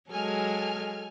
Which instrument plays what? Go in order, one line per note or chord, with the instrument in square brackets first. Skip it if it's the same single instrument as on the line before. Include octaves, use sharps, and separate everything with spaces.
[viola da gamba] F#3 G#3 [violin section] A4 G#5 F6